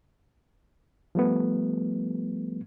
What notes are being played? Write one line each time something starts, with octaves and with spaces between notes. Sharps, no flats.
F3 G3 A3 B3